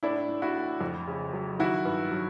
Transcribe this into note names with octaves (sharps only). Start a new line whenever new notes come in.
A2 D4 E4
A2
E4 F#4
A2
F2
C#3
F#3
D#3 E4 F#4
G2
F#3